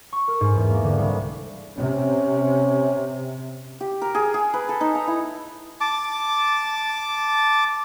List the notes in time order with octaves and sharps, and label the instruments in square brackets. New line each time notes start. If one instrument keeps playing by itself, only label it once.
[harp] C#6
A#4
G#2
E2
A#3
D3
C2
[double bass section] C3 [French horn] C#4
[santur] G4
A#4
G#4
G#4
B4
A4
D#4
A#5
E4
[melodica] A5 D6